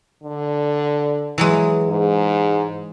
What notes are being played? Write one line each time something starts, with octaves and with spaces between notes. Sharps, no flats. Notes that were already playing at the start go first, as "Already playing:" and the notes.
D3
E3 F#3 G#3
G#2